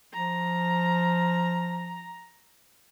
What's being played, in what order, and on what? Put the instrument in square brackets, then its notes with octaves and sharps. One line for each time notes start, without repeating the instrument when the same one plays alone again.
[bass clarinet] F3 [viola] A#5